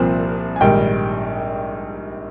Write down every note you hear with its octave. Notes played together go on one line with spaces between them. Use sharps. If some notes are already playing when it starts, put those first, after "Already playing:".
Already playing: C2 A#2 F3 C4
G#5
A#1 G#2 D#3 G3 G5